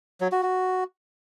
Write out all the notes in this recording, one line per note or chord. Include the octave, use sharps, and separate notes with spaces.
F#3
F#4
F#4